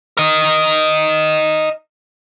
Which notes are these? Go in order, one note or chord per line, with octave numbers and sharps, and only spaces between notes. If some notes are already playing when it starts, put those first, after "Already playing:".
A#4 D#5